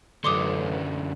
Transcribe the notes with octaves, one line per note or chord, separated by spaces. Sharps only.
A1 F#2 D3 C6 D6 D#6